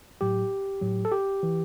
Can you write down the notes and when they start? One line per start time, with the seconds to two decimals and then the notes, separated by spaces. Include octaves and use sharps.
0.21 A2 F#3 G4
0.81 A2 F#3
1.05 A4
1.12 G4
1.43 E3